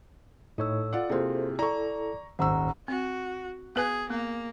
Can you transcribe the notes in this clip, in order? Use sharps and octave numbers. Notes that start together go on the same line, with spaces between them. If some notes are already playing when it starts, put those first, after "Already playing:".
A2 D#4 A4 C#5 E6
F4 D5 F#5
C3 A#3 E4 F4 G#4 A4 C5
E4 A4 D5 A#5 C#6
D#1 G#1 C5 F#5 A#5 C#6 E6
C4 F#4
B3 G#4 B4 G#5
A#3 B3